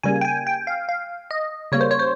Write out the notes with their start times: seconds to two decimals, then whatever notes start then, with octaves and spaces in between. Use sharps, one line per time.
0.03 C#3 G3 A#3 G#5
0.21 G5
0.25 G#5
0.47 G5
0.67 F5
0.89 F5
1.31 D#5
1.72 C#3 G3 A#3 C#5
1.81 C5
1.91 C#5
1.99 C5